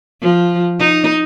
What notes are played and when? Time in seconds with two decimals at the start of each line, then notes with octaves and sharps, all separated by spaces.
0.22 F3
0.79 D#4